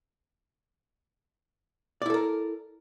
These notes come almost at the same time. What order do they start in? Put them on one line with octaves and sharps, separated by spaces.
D5 E4 A4 A#4